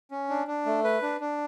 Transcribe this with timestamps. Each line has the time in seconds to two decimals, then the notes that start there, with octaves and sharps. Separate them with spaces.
0.11 C#4
0.29 D4
0.47 D4
0.66 A3
0.84 B4
1.02 D4
1.20 D4